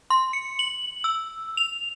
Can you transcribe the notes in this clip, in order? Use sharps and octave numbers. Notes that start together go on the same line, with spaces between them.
C6
C#7
F#7
E6
F7